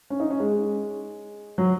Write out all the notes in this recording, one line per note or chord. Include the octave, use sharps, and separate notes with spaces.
C#4
D#4
C#4
G#3
F#3